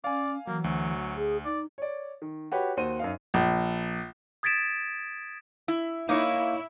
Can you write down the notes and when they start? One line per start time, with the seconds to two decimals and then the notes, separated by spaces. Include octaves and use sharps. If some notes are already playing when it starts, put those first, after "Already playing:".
0.04 C#4 D5 F5 G#5
0.47 E3 F#3 A#3
0.64 D2 F#3
1.16 G#4
1.45 D#4 D5
1.78 C#5 D5
2.22 D#3
2.52 F#4 G4 B4 C#5
2.77 D#2 F#4 C5 D#7
2.99 F#2 D#4 F5
3.34 A#1
4.43 D#6 G#6 A6 B6 D7 E7
5.68 E4
6.09 A#3 D#4 E4 C#5